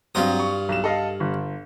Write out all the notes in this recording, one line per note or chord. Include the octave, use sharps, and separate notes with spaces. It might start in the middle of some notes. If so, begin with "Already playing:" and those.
G2 F#3 C4 F4 G4 D#6
C#6
B1 E7
A4 D#5 F5
G1